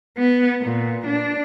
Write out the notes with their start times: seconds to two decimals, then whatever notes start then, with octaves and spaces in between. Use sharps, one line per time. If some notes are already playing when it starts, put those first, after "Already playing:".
0.18 B3
0.62 A#2
1.06 D4